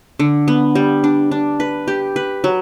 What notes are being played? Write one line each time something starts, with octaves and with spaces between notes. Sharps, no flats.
D3
B3
G3
D4
D4
B4
G4
B4
F#3